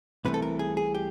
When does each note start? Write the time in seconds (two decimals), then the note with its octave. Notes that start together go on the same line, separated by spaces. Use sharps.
0.25 C2 C3 E3 A3 B4
0.34 A4
0.42 A#4
0.59 G#4
0.77 G#4
0.94 G4